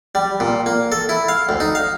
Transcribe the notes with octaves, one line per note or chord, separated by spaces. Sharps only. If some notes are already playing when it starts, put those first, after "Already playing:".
G3
A#2
A#3
A4
E4
F5
D2
D#4
F5